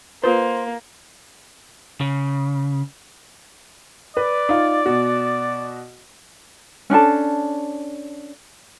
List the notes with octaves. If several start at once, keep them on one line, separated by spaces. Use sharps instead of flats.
A#3 F4 B4 C5
C#3
B4 D5
D#4 F4
B2 F#4
C#4 D4 A4 A5